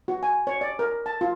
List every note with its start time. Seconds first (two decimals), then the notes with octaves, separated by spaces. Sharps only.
0.08 F#4
0.23 G#5
0.47 C#5
0.61 D5
0.79 A#4
1.06 A5
1.21 F4